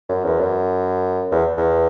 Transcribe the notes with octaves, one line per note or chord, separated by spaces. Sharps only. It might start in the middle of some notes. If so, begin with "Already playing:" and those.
F#2
E2
F#2
E2
E2